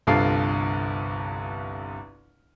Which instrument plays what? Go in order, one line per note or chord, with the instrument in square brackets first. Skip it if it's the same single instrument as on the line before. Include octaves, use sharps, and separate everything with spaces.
[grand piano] G1 C2 G2 F4 A4 C7